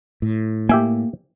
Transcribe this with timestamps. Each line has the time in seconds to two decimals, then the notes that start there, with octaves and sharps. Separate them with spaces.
0.22 A2
0.69 A#3 G4 E5 G#5